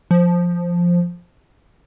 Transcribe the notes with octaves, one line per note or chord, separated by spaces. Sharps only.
F3